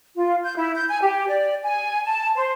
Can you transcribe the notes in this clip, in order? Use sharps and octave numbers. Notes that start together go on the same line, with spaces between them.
F4
G6
E4
G6
G#5
G4
D5
G#5
A5
C5